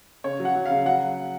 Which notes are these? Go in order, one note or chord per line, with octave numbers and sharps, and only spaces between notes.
C#3 C#5
F#3
F#5
F#3
C#3 F5
F#3 F#5